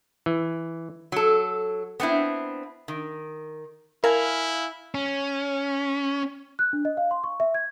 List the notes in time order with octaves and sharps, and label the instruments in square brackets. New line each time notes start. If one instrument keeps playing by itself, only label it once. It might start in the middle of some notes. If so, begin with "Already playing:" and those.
[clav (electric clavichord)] E3
[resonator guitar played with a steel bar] F#3 A4
B3 C4 D4 E4
D#3
[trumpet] E4 [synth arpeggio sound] A#4 [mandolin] F5 G#5
[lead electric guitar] C#4
[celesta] F#6
D4
D#5
F5
C6
C#6
E5
G#6